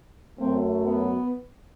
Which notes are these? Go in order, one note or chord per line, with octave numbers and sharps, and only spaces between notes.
F#2 F#3 A3 C4
B3